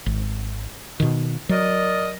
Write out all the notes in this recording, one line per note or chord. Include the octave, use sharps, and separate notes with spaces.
G#1
B2 D#3
F#3 A#4 D5 D#5